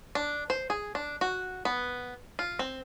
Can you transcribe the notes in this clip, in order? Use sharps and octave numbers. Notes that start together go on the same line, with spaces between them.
D4
C5
G#4
D4
F#4
B3
F4
C4